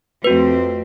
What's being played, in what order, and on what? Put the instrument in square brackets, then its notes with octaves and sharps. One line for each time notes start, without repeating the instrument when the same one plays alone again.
[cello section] F2 A3 C4 [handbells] F#4 B4